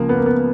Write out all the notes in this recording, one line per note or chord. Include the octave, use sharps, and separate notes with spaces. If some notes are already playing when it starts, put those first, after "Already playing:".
Already playing: C#2 C#3 F3 A#3
B3
A#3
B3